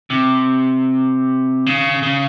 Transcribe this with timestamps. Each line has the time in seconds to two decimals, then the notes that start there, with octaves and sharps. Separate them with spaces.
0.10 C3
1.66 C#3
2.03 C#3